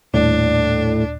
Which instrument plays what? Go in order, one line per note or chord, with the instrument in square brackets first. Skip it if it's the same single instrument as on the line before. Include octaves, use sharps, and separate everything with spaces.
[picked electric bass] D#1 [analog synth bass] A2 [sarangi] D4